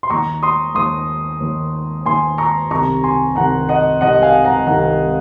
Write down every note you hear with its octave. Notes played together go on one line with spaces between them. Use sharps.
C6
D#2 D#3 A#5 C#6
C6 D#6
D#2 D#3 C6 D#6
D#2 D#3
D#2 D#3 G#5 C6
A#5 C#6
C2 C3 D#3 A#5 C#6
G#5 C6
C2 C3 D#3 F#5 A#5
D#5 F#5
C2 C3 D#3 D#5 F#5
F5 G#5
F#5 A#5
C2 C3 D#3 F#5 A#5